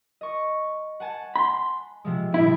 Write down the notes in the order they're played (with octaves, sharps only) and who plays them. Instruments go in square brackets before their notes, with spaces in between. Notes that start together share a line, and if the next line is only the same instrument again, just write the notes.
[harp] D#5 C#6
F#5 G#5 A5
[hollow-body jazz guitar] B5 C6
[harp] C3 F3 G#3
[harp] G1 A#2 G5 [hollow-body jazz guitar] E4